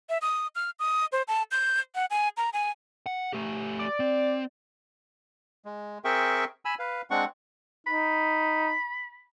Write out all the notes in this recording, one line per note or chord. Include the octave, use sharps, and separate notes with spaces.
E5
D#6
F6
D#6
C5
A5
G6
F#5
G#5
A#5
G#5
F#5
A3 G4
D5
C4
G#3
C4 G#4 A#4 E5 G5 C#6
G#5 B5 E6
B4 F5
G#3 C4 D4 F#5 C#6
D#4 B5